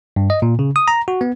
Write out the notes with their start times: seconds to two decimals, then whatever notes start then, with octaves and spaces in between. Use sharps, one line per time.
0.16 G2
0.30 D#5
0.42 A#2
0.59 C#3
0.76 D#6
0.88 A#5
1.08 F#4
1.21 B3